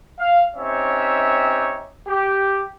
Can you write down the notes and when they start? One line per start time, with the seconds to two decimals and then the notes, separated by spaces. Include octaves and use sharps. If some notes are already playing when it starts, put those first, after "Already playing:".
0.19 F5
0.56 C4 C#4 D#4 G4 C#5 E5
2.08 G4